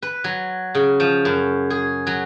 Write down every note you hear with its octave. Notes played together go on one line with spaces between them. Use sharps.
B4
F#3
C#3
F3
F#2
G#4
F#3